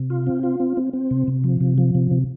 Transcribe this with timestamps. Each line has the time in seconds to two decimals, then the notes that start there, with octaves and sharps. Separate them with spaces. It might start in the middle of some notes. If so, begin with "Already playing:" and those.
Already playing: C3
0.10 F4
0.27 C4
0.43 F4
0.60 C4
0.77 C4
0.93 C4
1.11 C3
1.28 C3
1.44 F3
1.61 C3
1.78 F3
1.95 C3
2.11 C3